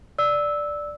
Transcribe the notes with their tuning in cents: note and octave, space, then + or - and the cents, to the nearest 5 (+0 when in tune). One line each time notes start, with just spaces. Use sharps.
D5 +0 E6 -10